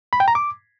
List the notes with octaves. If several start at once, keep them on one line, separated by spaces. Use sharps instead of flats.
B5
G5
A#5
D6